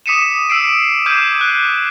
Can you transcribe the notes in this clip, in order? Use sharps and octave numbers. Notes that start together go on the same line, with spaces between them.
D6 D#6 B6 C#7 D#7 E7
E6 C7 D7
D6 F6 G6 G#6 D#7 E7
F#6